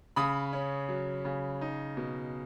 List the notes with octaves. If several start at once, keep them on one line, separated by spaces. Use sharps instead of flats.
C#3 B5 D#6
C#4
F#3
C#3
D#4
B2